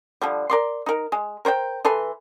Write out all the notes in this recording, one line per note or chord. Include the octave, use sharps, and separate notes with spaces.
D3 F3 G3
A#4 D5 C6
D#4 A#4
G#3
A#4 C5 C#5 G5
E3 A4 B4 C6